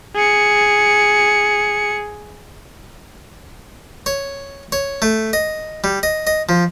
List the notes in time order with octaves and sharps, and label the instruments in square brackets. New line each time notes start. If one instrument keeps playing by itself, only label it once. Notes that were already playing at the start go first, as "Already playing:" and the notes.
[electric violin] G#4 C#7
[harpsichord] C#5
C#5
A3
D#5
G3
D#5
D#5
F3